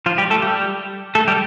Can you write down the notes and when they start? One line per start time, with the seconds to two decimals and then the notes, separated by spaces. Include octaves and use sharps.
0.06 F3 F4
0.18 G3 G4
0.30 A3 A4
0.42 G3 G4
1.15 A3 A4
1.28 G3 G4